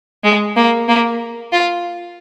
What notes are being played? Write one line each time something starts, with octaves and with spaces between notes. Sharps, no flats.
G#3
A#3
A#3
F4